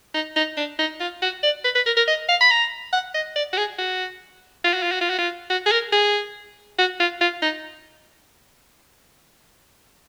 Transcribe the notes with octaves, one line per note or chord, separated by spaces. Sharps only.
D#4
D#4
D4
D#4
F4
F#4
D5
B4
B4
A#4
A#4
D#5
F5
B5
A#5
F#5
D#5
D5
F#4
G#4
F#4
F4
F#4
F4
F#4
F4
F#4
F4
F#4
G#4
A#4
G#4
F#4
F4
F4
D#4